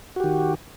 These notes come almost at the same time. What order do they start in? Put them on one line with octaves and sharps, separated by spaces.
F#4 G4 D#3